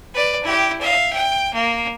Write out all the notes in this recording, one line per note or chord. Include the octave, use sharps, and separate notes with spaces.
B4 D5
E4 G4
E5 F5
G5
A#3